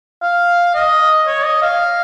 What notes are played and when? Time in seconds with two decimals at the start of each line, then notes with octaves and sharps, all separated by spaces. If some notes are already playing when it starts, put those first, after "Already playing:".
0.22 F5
0.74 D#5
1.27 C#5
1.45 D#5
1.62 F5